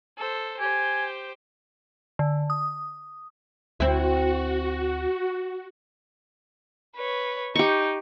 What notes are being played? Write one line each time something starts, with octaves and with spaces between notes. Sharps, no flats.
A4 C5
G4 C5 G#5
D3
D#6
D2 C4 E4 F#4
B4 C#5
D#4 G4 C#6